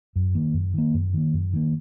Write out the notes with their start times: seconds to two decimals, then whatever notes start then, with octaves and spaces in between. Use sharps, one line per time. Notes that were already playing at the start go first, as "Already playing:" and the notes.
0.16 F#2
0.35 D#3 A#3
0.54 F#2
0.74 D#3 A#3
0.94 F#2
1.14 D#3 A#3
1.34 F#2
1.53 D#3 A#3